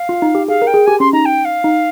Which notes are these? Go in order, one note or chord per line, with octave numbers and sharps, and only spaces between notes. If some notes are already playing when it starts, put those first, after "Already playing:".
Already playing: F5
F4
D#4
G4
G#4 F5
A#4
G5
G#4
G4 G#5
C#4 C6
D#4 A#5
G5
F5
D#4